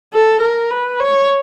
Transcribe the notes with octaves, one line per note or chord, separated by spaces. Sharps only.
A4
A#4
B4
C#5